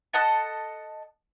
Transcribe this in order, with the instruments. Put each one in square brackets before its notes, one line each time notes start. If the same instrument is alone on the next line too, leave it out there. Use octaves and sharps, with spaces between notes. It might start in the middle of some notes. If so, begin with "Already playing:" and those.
[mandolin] A4 D#5 F#5 A5